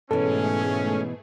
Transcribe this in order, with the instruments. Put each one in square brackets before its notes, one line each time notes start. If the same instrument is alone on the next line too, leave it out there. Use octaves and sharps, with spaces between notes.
[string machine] G#2 A3 G#4 [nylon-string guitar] B2 E3 [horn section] C#4 [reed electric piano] A4